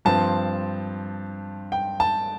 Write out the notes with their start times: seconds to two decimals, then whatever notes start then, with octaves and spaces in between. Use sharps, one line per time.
0.05 G2 F3 C4 A5
1.72 G5
2.00 A5